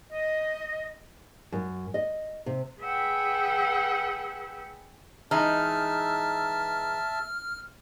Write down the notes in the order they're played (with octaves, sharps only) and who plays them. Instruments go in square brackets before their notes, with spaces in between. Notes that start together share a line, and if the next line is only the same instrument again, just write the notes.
[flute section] D#5
[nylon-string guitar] F#2
D#5
C3
[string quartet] G#4 B4 E5 F#5 G5
[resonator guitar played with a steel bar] E3 G#3 D#4 [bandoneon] E5 A5 [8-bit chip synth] F6